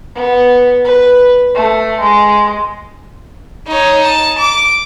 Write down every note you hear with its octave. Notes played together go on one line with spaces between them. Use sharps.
B3
B4
A3
G#3
D#4 C#5
A5
D6